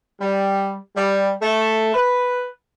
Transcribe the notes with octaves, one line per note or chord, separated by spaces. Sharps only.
G3
G3
A3
B4